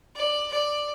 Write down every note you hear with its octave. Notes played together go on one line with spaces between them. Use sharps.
D5
D5